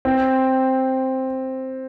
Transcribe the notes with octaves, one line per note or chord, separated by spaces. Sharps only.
C4